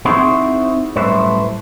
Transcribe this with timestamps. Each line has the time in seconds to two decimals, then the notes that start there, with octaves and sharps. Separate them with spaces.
0.05 C4 D#4 E4 F#4 G#4 C5
0.96 F#2 A2 G3 B4 C5 E5